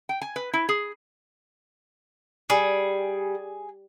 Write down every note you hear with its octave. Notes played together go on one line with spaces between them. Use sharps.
G5
G#5
B4
E4
G#4
G3 G#4